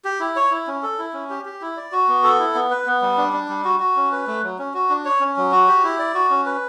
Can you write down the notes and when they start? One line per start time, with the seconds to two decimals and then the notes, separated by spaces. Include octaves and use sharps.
0.05 G4
0.20 E4
0.36 C#5
0.51 E4
0.67 C#4
0.83 A4
0.99 E4
1.14 C#4
1.30 G4
1.45 G4
1.62 E4
1.77 D5
1.92 F#4
2.09 B3
2.24 A4
2.39 E4
2.55 B3
2.71 B4
2.86 B3
3.02 G3
3.18 D4
3.33 D4
3.49 G3
3.65 F#4
3.80 F#4
3.96 C#4
4.12 B4
4.27 A3
4.43 F#3
4.59 C#4
4.74 F#4
4.90 D4
5.05 C#5
5.21 C#4
5.37 F#3
5.52 F#4
5.68 G4
5.84 E4
5.99 D5
6.15 F#4
6.30 C#4
6.46 B4